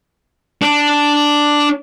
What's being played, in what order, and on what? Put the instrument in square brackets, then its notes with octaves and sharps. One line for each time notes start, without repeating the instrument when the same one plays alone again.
[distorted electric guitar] D4